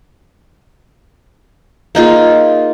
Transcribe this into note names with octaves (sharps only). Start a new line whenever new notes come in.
A#3 D#4 F4 G#4